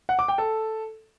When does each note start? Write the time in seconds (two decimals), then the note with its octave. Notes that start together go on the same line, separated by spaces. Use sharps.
0.09 F#5
0.19 D6
0.28 G5
0.38 A4